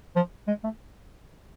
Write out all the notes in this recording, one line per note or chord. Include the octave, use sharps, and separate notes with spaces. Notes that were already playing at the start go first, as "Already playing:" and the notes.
F3
G#3
A3